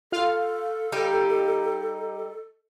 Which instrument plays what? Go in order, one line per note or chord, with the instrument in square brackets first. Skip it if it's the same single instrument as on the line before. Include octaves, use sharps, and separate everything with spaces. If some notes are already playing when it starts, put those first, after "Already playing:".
[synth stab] F4 F5 [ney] A4
[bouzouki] G3 D#4 G4